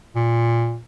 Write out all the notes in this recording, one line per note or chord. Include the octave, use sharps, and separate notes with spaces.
A#2